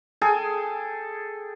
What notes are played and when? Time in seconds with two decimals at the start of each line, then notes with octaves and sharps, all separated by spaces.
0.21 G#4 A4 G5 G#5